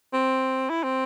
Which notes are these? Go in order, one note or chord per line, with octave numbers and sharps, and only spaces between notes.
C4
E4
C4